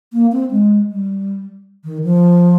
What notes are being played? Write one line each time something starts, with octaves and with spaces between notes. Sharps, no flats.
A#3
C4
G#3
G3
D#3
F3